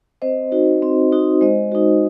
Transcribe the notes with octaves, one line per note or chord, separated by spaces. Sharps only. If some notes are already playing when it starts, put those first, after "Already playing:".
C4 C5 D#5
D#4 F#4
C4
D#4 F#4
G#3 C5 D#5
D#4 F#4